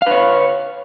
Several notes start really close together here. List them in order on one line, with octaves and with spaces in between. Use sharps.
F5 B4 C#5